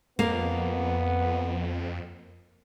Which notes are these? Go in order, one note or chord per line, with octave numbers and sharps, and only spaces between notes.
F2 A#3 B3